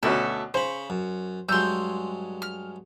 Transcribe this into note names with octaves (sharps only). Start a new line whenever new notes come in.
D2 B2 C#4 A4 E5
C#3 C5 C#5 B5
F#2
G2 F#3 G#3 C6 E6 G6
F6